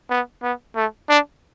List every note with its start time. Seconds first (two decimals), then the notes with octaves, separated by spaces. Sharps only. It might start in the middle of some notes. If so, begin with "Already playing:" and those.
0.10 B3
0.43 B3
0.76 A3
1.09 D4